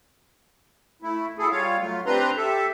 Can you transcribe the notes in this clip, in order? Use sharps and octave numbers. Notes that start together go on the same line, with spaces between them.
A3 E4
F#3 E4 G#4 A4
G3 F4 C#5 F5
F#3 A3 F4
C4 D4 G4 B4 A#5 C6
G4 A4 E5